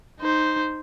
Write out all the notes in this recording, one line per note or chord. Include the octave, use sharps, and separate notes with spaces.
D#4 C5